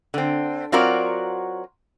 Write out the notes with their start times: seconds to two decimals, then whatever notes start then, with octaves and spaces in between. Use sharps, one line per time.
0.14 D3 C4
0.72 F#3 C4 F4 F#4 A#4 D5